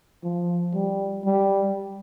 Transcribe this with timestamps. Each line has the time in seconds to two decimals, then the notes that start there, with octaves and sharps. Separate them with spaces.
0.24 F3
0.74 G3
1.25 G3